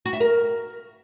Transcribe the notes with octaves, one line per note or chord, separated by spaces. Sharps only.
F#4
E5
A#4